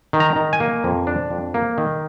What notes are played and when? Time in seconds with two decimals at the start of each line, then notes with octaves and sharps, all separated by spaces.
0.13 D#3
0.20 A#5
0.36 D#3
0.53 G#5
0.60 A#3
0.84 F2
1.07 D4
1.30 F2
1.54 A#3
1.78 D#3